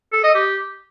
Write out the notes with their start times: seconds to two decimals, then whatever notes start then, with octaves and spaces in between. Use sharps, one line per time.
0.12 A4
0.24 D#5
0.35 G4